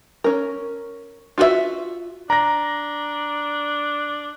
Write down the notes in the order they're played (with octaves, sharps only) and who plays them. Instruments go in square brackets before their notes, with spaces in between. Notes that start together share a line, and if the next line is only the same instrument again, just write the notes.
[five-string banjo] C#4 A#4
F4 F#4 G#4 E5
[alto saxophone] D4 [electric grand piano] A#5 A#6